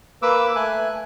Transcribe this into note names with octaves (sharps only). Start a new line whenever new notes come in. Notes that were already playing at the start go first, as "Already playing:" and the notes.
A#3 B4 D6 E6
A3 G#5 F#6